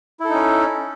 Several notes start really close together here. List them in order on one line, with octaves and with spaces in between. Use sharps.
E4 A4 D#4 C#4